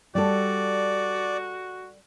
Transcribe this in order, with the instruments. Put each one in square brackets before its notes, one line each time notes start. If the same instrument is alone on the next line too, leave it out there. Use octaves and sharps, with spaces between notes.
[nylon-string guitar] G3 A4 [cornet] F#4 [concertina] D5